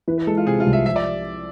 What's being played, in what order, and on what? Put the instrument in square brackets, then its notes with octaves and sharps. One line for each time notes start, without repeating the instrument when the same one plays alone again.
[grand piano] E3 [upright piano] B4
[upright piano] B4
[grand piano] G#3 [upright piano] A4
[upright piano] F4
[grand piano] C3 [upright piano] G#4
[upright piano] F4
[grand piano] C2
[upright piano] E5
[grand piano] F3 [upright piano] E5
[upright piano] D5